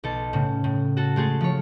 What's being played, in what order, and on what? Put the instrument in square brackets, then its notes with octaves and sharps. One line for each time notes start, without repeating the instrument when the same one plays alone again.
[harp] B1 A4
A2 C#3
A2
F#4 A4
G#3 A3 G#4 A4
F3 C#5